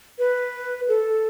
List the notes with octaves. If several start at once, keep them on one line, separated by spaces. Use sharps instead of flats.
B4
A4